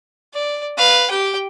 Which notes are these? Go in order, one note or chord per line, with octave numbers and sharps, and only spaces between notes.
D5
B4 F5
G4 G5